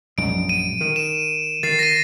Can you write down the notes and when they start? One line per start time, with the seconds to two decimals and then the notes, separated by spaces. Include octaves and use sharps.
0.18 A#1 F#2 G#3 D7
0.49 D#7
0.81 D#3
0.96 E7
1.63 D#3 A6 C7
1.79 A#6 D#7